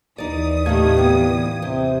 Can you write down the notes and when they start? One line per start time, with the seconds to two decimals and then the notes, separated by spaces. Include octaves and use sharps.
0.18 D#2 E3 D#4 D5 D#6
0.66 A2 C3 D#3 A3 G4 F5 G#6
0.97 D2 B3
1.62 C3 G4